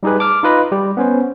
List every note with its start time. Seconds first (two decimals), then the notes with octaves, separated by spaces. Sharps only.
0.03 G3 D#4 G4 G#4 B4
0.19 A5 D6 F6
0.43 D#4 F4 B4 D#5 B5
0.72 G3 G4
0.97 B3 C#4 C5